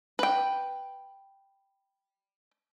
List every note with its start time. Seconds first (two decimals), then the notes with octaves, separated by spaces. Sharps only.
0.19 B4 G5